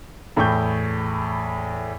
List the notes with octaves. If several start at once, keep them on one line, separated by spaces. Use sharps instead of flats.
E2 A2 G5 C#6 G6